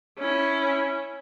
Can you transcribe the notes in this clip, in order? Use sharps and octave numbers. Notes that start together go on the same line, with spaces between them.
C#4 E4